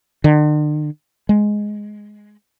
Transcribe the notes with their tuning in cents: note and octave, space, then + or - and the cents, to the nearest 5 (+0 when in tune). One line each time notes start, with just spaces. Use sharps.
D3 +45
G#3 +5